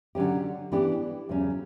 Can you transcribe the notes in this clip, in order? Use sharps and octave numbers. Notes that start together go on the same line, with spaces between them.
D3 F#3 C#4 G4
E3 B3 D4 G4
E2 C#3 F#3 C#4